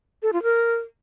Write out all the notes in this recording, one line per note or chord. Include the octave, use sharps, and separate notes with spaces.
A4
F4
A#4